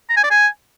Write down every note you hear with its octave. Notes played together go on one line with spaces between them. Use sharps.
A#5
G#5
D5
G#5